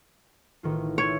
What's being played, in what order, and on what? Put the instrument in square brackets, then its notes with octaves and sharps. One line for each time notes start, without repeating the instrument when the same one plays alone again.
[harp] A1 D#3 F4
[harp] D4 F4 E5 [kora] C#5